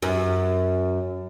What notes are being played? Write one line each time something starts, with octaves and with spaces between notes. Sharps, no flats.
F#2